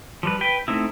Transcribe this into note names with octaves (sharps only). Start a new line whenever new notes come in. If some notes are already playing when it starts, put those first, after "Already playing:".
F3 G3 B4
B4 G5
A3 C4 D#4 E4